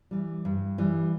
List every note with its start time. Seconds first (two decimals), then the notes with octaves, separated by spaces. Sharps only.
0.11 E3 G3
0.45 G2
0.78 E3 G3